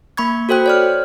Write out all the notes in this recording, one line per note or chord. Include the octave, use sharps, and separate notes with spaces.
A#3 B5 C#6 G#6
F#4 A4 C5 G5 F#6
C#5 D5 F6